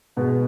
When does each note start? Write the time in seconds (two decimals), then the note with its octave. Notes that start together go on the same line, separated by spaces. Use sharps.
0.16 B2 G#3 B3